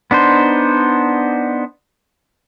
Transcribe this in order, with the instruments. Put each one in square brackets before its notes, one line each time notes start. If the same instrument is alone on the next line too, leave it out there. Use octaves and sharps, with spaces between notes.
[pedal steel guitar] B3 D4 D#4 C5